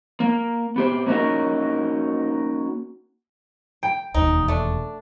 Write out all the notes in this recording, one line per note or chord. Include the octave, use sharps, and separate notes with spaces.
A#3
B3 G4 C5
A#3 C#4 D#4 F#4 A#4
G5
E1 D#2 D#4
A3 D4